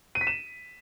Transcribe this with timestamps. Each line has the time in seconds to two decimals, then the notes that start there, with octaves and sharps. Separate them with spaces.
0.15 D#7
0.21 B6
0.27 E7